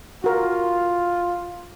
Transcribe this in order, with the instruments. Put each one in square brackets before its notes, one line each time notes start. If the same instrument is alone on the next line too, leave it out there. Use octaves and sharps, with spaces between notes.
[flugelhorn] F4 [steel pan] F#4 A#4